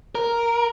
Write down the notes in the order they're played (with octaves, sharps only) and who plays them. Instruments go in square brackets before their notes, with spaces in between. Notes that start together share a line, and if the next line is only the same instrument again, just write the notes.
[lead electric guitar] A#4